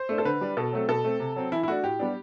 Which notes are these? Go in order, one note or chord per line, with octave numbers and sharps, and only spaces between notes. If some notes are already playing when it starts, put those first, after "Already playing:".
Already playing: C5
A3 D4
A4
D3 B4
G3 D4
B2 A4
F#3 A3 C4
B2 A4
A3 C4
C3
F#3 C4
E3 E4
E4
A3 D4 F#4
A2 G4
G3 B3 D4